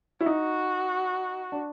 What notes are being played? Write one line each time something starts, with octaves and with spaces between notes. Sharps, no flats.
E4
D#4 F#4
D4